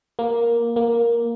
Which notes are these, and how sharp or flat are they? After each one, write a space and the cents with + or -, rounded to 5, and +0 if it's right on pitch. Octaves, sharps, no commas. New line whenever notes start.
A#3 +5
A#3 +5